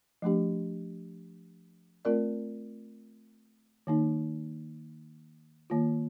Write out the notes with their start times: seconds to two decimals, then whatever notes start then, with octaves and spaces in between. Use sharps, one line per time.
0.22 F3 A3 D4 G4
2.05 A3 C4 F4 A#4 D5
3.87 D#3 A#3 D#4
5.70 D#3 A#3 F4